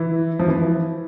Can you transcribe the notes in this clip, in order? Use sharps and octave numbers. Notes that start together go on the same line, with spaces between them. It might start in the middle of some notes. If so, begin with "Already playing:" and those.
Already playing: E3
F3
E3